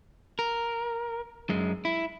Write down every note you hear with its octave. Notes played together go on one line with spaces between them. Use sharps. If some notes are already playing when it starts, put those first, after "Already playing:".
A#4
F#2 G#3
E4